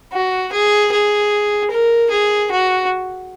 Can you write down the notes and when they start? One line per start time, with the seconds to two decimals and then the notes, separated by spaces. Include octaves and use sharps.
0.13 F#4
0.52 G#4
0.92 G#4
1.71 A#4
2.10 G#4
2.51 F#4